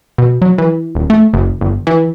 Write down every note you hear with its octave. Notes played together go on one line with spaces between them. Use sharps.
B2
F#3
E3
D#1
A3
F#1
G1
E3